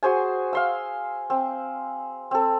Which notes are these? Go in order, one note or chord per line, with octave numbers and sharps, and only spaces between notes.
F#4 G#4 C5 G#5
F5 C6 E6
C4
C4 A4